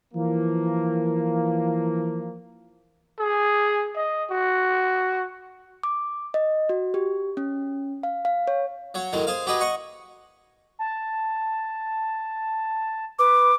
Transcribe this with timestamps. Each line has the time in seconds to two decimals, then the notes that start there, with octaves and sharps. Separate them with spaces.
0.14 E3 F3 A#3
3.19 G#4
3.96 D#5
4.30 F#4
5.83 D6
6.34 D#5
6.69 F#4
6.94 G4
7.37 C#4
8.03 F5
8.25 F5
8.48 C#5
8.94 F#3 C#5
9.13 A2 D#3 F#3 G#3
9.27 G#4 C5 F5
9.46 F#3 G4 G#4 B4 D#5
9.61 D#5 F#5 C#6
10.79 A5
13.19 B4 D6